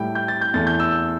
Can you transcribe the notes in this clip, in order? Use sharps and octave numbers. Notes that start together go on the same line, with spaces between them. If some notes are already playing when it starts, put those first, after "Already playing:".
Already playing: A2 G3 E4 G5
G6
A6
G6
E2 E3 A3 A6
G6
E6